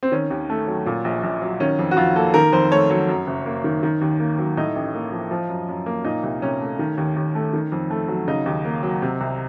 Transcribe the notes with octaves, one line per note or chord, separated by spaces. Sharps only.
C4
D#3 C#4
D#2
A3
F#3
A#2
A#1
A#1
F#3
D#3 C#4
F2
F#4
F2 F4
A#3 A4
D#3 A#4
F2 C5
A3 C#5
F#3 C#5
F#2
F#1
A#3
D#3
D#3
D#2
A#3
F#3
A2 D#4
A1
A#3
F3
F3
F#2
F#2
A#3
A#2 D#4
C2
C2 C#4
A3
D#3
D#2
D#2
A3
D#3
F2
A3
F#3
C#3 D#4
D#2
A#3
F#3
C3
C2